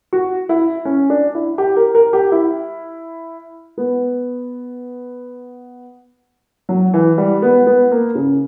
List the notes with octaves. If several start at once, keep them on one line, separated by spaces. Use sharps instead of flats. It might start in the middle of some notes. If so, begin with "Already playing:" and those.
F#4
E4
C#4
D4
E4
G4
A#4
A#4
G4
E4
B3
F#3
E3
G3
B3
B3
A#3
C#3